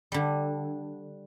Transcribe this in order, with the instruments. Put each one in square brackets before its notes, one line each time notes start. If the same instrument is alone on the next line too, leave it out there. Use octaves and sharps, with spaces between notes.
[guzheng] D3 G3